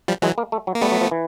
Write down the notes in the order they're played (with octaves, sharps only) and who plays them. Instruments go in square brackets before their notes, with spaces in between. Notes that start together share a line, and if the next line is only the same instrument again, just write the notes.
[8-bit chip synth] F3 G3
[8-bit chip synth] E3 F#3 [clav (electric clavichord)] G#3
[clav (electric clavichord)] A#3
A3
F#3
[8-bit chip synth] A#3
[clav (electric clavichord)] G3 [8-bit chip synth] A3 B3
[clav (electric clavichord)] F#3
F3
E3